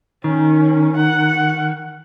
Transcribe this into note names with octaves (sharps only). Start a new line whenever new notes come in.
D#3 C#4
F#5